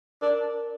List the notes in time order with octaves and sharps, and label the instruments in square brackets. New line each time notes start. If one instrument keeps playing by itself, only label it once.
[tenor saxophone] D4 [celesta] A#4